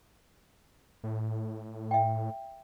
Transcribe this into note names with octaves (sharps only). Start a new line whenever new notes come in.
A2
E5 G5